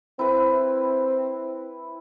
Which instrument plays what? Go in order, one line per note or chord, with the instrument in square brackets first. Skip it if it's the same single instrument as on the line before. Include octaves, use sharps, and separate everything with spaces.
[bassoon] C4 [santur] E4 B4